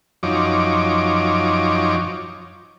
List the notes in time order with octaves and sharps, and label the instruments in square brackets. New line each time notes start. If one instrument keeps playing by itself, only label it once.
[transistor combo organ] F#2 F3 D#4 C#5 D6